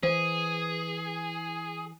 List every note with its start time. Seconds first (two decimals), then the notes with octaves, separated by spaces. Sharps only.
0.03 E3 G#4 C5